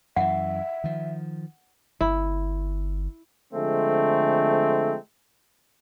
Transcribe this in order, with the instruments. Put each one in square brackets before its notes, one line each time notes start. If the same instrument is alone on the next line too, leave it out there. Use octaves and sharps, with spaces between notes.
[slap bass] F#2 E3 [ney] E5 [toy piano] F#5
[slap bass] D#3 F3
[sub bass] G1 [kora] E4
[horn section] D3 F3 G#3 A3 C4